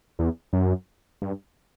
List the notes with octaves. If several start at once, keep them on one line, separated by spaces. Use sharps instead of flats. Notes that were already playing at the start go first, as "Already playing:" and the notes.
E2
F#2
G2